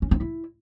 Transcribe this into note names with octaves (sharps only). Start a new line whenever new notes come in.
C#4
C4
E4